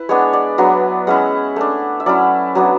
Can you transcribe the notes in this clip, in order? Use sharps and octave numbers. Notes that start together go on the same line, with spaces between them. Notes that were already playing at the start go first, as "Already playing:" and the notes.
Already playing: E4 B4
G#3 B3 D4 C#5
D5
F#3 B3 D4
G#3 C#4 E4 F#5
A3 D4
E5
F#3 C#4 E4 D5
F#3 B3 D4